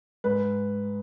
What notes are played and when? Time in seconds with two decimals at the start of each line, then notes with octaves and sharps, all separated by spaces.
0.24 G#2 B4